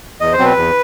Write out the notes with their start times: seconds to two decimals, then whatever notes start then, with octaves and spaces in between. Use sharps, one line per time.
0.20 E2 D#5
0.32 C5
0.39 B2 F#3 C4
0.45 B4
0.57 E2